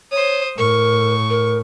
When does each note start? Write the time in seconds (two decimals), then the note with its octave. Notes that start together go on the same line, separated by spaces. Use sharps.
0.11 C5 C#5 D#6
0.58 A2 A#4 C#6
1.30 A#4